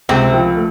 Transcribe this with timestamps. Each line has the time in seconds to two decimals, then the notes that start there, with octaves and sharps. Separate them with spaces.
0.09 C#2 C3 C4
0.32 F3
0.56 A3